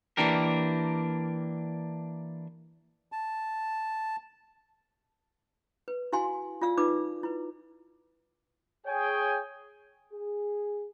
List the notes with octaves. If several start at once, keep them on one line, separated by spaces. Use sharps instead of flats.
E3 A#3 D4 G4 A#4
A5
B4
E4 F#4 F5 G#5 C6
F4 D5 F5 E6
D#4 F4 B4 D5 D6
E4 B4
G#4 C#5 G5 G#5
G#4